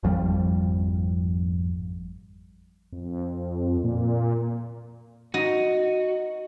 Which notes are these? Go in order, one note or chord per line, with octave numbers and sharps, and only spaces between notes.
G#1 F2 F3 G3
F2
A#2
D#4 F#4